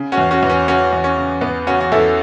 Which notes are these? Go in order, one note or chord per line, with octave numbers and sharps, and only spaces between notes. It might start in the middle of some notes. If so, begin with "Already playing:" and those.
Already playing: C#3
C#4 F#4
E2
C#4 F#4
E2
C#4
C#3 C#4 F#4
E2
C#4
C#3
E2 B3
C#3 C#4 F#4
F#4
E2 E4 A4